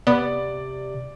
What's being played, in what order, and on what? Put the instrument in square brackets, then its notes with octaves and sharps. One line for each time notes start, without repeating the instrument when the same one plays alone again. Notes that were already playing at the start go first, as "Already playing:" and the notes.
[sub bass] C3 [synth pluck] B3 [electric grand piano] D5